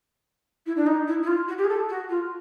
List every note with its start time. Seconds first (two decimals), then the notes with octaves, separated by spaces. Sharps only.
0.66 E4
0.76 D4
0.86 D#4
1.07 E4
1.22 E4
1.27 F4
1.48 F#4
1.57 G4
1.64 G#4
1.68 A4
1.89 F#4
2.09 F4